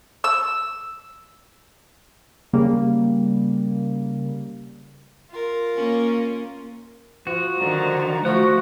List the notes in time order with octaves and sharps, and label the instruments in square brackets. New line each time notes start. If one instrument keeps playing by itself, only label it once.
[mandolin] E6
[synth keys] C#3 G3 A#3
[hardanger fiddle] F4 A#4
[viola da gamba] A#3 C#4
[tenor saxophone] F3 [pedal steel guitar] F#4
[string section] D3 D#3 [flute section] A#5
[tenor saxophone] F3 [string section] A3 [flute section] F#4 [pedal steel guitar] F#5